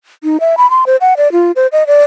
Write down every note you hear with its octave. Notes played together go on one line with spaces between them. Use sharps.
D#4
E5
B5
C6
C5
F#5
D5
F4
C5
D#5
D5